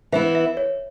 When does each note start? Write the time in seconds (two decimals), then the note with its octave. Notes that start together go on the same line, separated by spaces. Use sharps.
0.12 E3 B3 E4 E5
0.35 E5
0.57 C#5